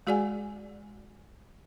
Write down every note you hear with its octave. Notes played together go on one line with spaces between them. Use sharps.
G#3 F#4 G#4 D5 F#5 G#5